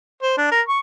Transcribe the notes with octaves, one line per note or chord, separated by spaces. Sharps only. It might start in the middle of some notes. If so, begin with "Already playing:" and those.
C5
D4
A#4
C#6